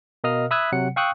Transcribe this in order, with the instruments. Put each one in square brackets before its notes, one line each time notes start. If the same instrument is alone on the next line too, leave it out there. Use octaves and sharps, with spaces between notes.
[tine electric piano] B2 A#4 D#5 F5 D#6 F6
E5 B5 D#6 E6 F#6 G#6
C3 F#3 F#5 C#7
F5 G5 C#6 D#6 E6 F#6